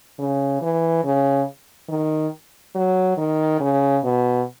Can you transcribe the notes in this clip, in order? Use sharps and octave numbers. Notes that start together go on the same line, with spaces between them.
C#3
E3
C#3
D#3
F#3
D#3
C#3
B2